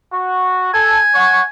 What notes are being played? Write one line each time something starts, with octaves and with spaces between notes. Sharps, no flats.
F#4
A4 G#5
C#5 F#5 C#6